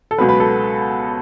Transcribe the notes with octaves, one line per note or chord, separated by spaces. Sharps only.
A4
C#2 B2 F#3 B4
B4
A4